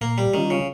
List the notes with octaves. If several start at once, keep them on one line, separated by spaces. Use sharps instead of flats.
A#2 A#3
G3
D#3 G3 C#4 F4
C#3